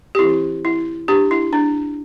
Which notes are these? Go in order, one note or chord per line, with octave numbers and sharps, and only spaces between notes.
G4
E3 C4 E4
E4
D4 G4
E4
D4